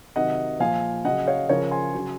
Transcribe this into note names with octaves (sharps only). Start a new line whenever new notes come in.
C3 D#3 F#3 D#5 F#5
A#2 F3 F5 G#5
C#3 F#3 D#5 F#5
C#5 F5
C#3 F3 A#4 C#5
G#5 C6
C#3 F#3